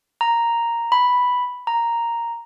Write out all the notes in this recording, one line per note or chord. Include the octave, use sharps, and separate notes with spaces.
A#5
B5
A#5